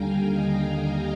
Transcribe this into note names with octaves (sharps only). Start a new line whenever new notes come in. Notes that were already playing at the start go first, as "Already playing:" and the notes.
Already playing: D#2 D3 G3 F5 G5 G#5 A#5
D#5 G5
F5 G#5